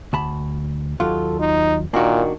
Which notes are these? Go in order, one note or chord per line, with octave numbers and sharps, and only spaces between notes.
D2 A5 B5
D#2 F#3 F4 A4
D#4
A#2 D#3 A#3 D4 F#4